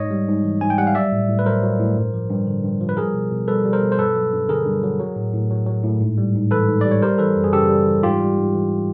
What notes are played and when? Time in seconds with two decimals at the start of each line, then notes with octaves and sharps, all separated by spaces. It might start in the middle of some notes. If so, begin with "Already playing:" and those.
Already playing: G#2 C#5 D#5
0.11 G3
0.28 G#2
0.44 E3
0.61 G#2 G#5
0.70 G5
0.78 G3 F#5
0.87 F5
0.95 F#3 D5 E5
1.12 A2
1.29 A2
1.39 B4
1.46 F#3 A#4 C5
1.63 F#3
1.79 A2
1.96 G2
2.14 F3
2.30 G2
2.47 D3
2.63 G2
2.81 F3
2.89 B4
2.97 G3 G#4 A#4
3.14 B2
3.31 B2
3.48 G3 A4 B4
3.65 G3
3.73 A#4 C5
3.82 B2
3.92 C5
3.98 G2 A4 B4
4.15 F#3
4.33 G2
4.49 D3 G#4 A#4
4.66 G2
4.83 F#3
5.00 F#3
5.16 A2
5.34 A2
5.51 F#3
5.67 F#3
5.84 A2
6.01 G#2
6.18 G3
6.35 G#2
6.51 E3 A4 B4
6.68 G#2
6.81 G3 D5
6.91 C#5
7.02 G3 A#4 C5
7.18 E3 A4 B4
7.36 F#2
7.44 G#4
7.53 C#3 G4 A4
7.69 G3
7.86 E3
8.03 G#2 F4 G4
8.20 G3
8.37 G#2
8.54 E3